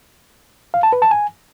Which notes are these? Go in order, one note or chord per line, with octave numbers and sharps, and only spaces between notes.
F5
A5
B4
A5
G#5